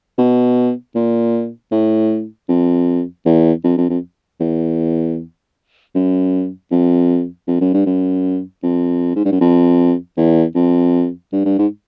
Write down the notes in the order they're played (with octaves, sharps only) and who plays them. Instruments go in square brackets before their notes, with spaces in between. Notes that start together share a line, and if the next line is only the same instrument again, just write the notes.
[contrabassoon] B2
A#2
A2
F2
E2
F2
F2
F2
E2
F#2
F2
F2
F#2
G2
F#2
F2
G#2
G2
F#2
F2
E2
F2
G2
G2
G#2